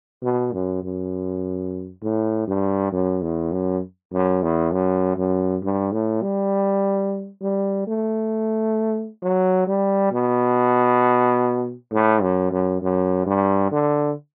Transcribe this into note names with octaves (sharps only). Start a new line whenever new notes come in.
B2
F#2
F#2
A2
G2
F#2
E2
F#2
F#2
E2
F#2
F#2
G2
A2
G3
G3
A3
F#3
G3
B2
A2
F#2
F#2
F#2
G2
D3